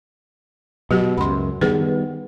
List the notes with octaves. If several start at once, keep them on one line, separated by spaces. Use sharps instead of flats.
B2 F#3 F#4 G4
C#2 F#2 B5 C6
D#3 G3 B3 G#4 B4